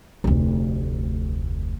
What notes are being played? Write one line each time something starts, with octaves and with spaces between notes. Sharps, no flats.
F1 D2